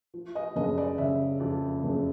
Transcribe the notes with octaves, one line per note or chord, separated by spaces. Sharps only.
F3
D#5
F#1 D#5
D5
C#3 E5
F2
F#1